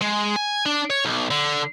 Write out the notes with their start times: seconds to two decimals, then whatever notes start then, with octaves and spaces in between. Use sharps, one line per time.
0.01 G#3
0.36 G#5
0.66 D4
0.90 C#5
1.05 B1
1.31 D3